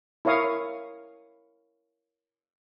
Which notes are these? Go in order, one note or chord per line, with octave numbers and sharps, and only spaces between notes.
E4 A#4 C#5 F5 D#6